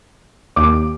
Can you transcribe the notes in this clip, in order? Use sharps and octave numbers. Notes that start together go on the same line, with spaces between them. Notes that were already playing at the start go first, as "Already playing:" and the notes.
D#2 D6